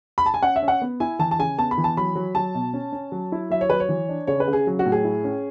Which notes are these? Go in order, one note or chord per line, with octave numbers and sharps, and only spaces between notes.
B5
A5
G#5
C#4 F#5
E5
C#4
F#5
B3
E4 G#5
E3 A5
A5
C#3 G#5
B3 A5
B5
E3
A5
F#3 B5
F#3
F#3 A5
B2
C#4
C#4
F#3
E4
F#3 E5
C#5
F#3 B4
C#5
E3
D4
C#3 C#5
B4
C#3
G#4
F#3
F#4
A2
G#4
E4
C#4